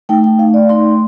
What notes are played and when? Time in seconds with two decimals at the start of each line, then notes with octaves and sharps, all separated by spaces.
0.09 A3 D#4 G5
0.24 G5
0.39 F5
0.54 D5
0.69 A3 D#4 C6